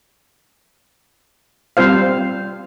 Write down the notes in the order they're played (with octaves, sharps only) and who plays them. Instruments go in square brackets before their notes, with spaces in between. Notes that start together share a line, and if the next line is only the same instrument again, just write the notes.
[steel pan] G3 C4 F4 C5 F5